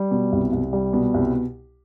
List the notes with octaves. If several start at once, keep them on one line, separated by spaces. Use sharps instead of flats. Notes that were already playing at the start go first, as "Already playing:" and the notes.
Already playing: G3
B2
C2
C2
G3
B2
C2